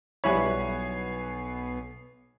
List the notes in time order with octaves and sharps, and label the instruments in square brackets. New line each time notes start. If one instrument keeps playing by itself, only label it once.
[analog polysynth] B1 B3 C7 [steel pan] G3 E4 B5 [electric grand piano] C#5 G#5